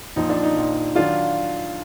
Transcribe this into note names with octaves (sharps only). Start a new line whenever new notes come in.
A#1 A#2 F3 D#4
D4
D#4
A#1 A#2 F3
D#3 F#3 D4 F4